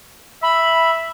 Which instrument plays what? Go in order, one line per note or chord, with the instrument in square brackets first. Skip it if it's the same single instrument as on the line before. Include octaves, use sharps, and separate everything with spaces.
[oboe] E5 [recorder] B5